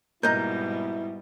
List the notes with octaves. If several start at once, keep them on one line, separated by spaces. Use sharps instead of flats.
G#2 B2 G3 A#3 E4 D#5 A#5 G6